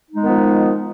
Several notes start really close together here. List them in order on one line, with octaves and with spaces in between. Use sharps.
D#4 G#3 B3 D#3 F3